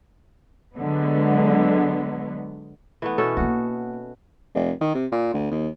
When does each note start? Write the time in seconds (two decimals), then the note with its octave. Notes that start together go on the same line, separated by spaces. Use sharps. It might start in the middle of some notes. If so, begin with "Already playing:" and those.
0.76 D3 F#3 G#3 B3
3.02 E3 A3 B3
3.18 B2 C#4 A4
3.37 A#3 E4 F#4
4.55 F1
4.81 D#3
4.95 C3
5.12 A#2
5.34 D2
5.51 D#2